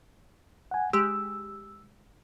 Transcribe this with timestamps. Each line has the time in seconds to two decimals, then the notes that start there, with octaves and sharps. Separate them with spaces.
0.71 F#5 G#5
0.93 G#3 G4 E6